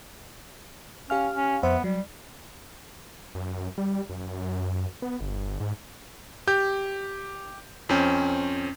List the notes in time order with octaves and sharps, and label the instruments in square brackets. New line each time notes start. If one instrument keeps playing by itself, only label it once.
[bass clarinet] C#4 [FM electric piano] G4 F5 F6
[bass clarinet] C#4
[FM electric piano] F2 C5 E5 [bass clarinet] B3
[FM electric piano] F#3 [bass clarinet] G3
[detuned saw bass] F#2
G3
F#2
B3
G1
G#2
[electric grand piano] G4 G6
F2 C4 C#4 G6